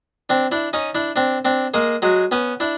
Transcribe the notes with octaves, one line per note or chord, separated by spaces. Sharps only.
C4 D4
D4 E4
C#4 D#4
D4 E4
C4 D4
C4 D4
G#3 A#3
F#3 G#3
B3 C#4
D4 E4